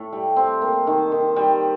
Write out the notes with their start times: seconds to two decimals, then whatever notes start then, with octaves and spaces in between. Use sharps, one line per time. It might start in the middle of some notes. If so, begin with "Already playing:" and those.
Already playing: A2 A3
0.13 G3
0.36 C4
0.62 A#3
0.87 D#3
1.12 D#3
1.36 G3